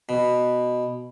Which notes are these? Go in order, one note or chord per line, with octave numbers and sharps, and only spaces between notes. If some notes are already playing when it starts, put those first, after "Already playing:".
B2